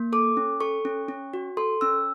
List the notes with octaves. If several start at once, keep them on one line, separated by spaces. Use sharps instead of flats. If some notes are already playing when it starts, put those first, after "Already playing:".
Already playing: A#3
A4 D6
C#4
A4 C#6
C#4
C#4
F#4
A4 C6
C#4 E6